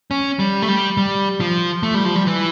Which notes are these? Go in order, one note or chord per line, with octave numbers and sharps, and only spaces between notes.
C#4
G3
A3
G3
G3
F3
A3
G3
F3
G3
E3